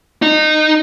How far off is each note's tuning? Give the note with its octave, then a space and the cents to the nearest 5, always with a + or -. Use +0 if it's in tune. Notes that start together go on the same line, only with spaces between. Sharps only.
D#4 -20